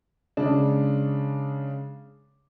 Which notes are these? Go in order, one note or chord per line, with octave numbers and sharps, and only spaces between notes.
C#3 G#3 D4